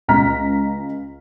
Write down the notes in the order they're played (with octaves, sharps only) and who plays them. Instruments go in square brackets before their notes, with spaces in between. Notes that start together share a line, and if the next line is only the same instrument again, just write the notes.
[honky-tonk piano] C#2 D#5 A#5 F6 B6